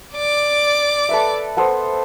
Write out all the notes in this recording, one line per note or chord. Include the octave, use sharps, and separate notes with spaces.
D5 D6
A4 B4 E5
B3 A4 C5